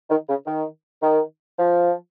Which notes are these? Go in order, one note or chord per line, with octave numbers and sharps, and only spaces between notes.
D#3
C#3
D#3
D#3
F3